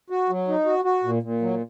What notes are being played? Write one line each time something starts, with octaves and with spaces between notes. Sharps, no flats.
F#4
F#3
D#4
F#4
F#4
A#2
A#2
F#3